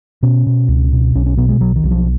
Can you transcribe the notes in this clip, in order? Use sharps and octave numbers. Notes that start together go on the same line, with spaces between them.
B2 C#4
B2
C#2
B2
B1 C#4
C#4
B2 B3
G#3
B1 F#3
D#3
B1
F3